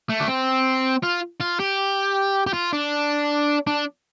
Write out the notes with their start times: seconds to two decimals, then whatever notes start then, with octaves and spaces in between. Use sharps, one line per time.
0.09 A3
0.20 D4
0.27 C4
1.03 F4
1.41 F4
1.60 G4
2.47 G4
2.53 F4
2.73 D4
3.67 D4